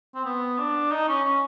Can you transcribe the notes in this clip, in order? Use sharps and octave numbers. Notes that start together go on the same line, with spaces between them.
C4
B3
D4
D#4
C#4
C#4